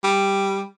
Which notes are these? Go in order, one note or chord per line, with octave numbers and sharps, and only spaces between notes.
G3